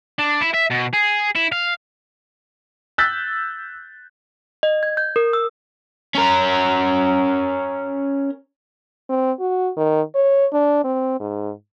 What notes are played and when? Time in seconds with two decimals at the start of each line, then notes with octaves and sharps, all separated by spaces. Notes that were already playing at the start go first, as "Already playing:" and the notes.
0.19 D4
0.41 E4
0.54 E5
0.71 B2
0.94 G#4
1.36 E4
1.52 F5
2.98 E6 F#6 G6 A6 B6
4.63 D#5
4.83 G#6
4.97 G6
5.16 A#4
5.33 E6
6.15 C#4 A#4
9.09 C4
9.40 F#4
9.77 D#3
10.15 C#5
10.53 D4
10.84 C4
11.20 G#2